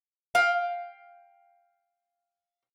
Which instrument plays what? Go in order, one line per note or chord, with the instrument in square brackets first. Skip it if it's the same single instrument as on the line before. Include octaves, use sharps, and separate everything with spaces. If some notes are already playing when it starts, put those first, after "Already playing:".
[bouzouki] F5 G5